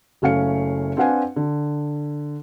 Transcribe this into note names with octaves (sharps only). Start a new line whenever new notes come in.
F#1 A3 C#4 F5 C#7
C4 D4 B4 F5 F#5 G#5
D3